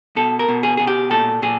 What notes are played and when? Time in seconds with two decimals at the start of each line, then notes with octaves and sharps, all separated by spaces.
0.16 B2 A4
0.39 A#4
0.48 B2
0.63 G#4
0.77 B2 G#4
0.87 G4
1.10 A#2 A4
1.42 A#2 G#4